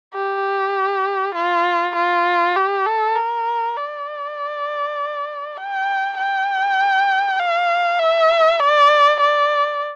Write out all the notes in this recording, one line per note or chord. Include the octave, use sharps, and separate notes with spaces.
G4
F4
F4
G4
A4
A#4
D5
G5
G5
F5
E5
D5
D5